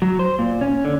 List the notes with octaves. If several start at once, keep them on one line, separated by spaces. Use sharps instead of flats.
F#3
C5
A#2
C#4
D3